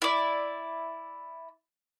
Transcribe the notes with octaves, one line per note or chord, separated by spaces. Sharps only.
E4 D5